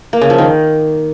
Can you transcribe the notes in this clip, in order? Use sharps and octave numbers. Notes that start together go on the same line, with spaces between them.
A#3
C#3
F3
D#3